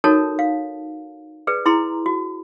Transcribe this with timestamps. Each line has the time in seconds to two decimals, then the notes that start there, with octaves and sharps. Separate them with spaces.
0.04 D#4 F#4 A4 A#4 C#5 A5
0.39 F5
1.47 G#4 B4 D5
1.66 E4 G#4 A#5 C6
2.06 F#4